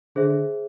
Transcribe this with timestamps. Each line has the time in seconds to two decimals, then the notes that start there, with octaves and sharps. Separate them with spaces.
0.16 D3 G#4 C5 E5